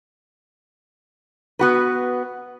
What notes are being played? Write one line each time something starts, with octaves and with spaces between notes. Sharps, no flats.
B3 F#4 B4